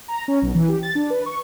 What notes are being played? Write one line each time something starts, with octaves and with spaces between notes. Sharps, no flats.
A#5
C#4
B1
E3
G4
A6
D4
B4
C#6